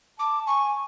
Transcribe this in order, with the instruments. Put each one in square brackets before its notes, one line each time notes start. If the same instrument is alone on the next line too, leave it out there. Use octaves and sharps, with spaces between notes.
[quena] A5 [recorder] D6
[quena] G#5 [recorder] C#6